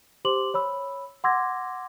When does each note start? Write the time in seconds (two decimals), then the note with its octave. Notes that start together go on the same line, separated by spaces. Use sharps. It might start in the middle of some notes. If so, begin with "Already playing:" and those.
0.25 G4 C5 C6 D6 F#7
0.54 C#5 B5 E6
1.24 F#5 C6 D6 E6 G#6 A#6